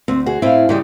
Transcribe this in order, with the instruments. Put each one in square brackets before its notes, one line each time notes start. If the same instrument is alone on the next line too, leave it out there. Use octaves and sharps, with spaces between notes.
[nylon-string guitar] D2 [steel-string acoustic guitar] C4
[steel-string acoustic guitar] F#4 G#4
[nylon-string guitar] A2 C4 [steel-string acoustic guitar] E4 F5
[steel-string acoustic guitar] G#2 G3 G#3 [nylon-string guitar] C#3